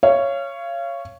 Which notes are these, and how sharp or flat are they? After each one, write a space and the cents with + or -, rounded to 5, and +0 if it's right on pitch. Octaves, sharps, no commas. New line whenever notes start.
C#5 +0 F5 -30